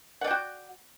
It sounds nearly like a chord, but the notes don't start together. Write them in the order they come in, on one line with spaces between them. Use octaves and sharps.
F#5 D5 G5 F#4